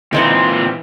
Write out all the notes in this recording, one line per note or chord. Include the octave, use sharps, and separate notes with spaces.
A#2 E3 C4 D#4 F#5